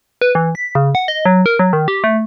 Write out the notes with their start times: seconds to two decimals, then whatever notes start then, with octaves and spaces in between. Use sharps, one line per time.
0.21 B4
0.35 E3
0.55 B6
0.75 C#3
0.95 F#5
1.08 D#5
1.25 F#3
1.46 A#4
1.59 F#3
1.73 D#3
1.88 G4
2.04 A3